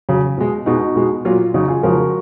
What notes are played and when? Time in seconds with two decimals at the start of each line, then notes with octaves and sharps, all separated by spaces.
0.09 C#3 F#3
0.38 B2 G#3
0.66 B2 G#3 D#4 F#4
0.95 B2 G#3
1.25 A#2 F#3 F4
1.54 C#3 F#3 D#4 F#4
1.68 F4 G#4
1.83 C#3 F3 G#3 F#4 A#4